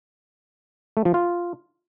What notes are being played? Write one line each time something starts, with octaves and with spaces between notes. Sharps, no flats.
A3
F3
F4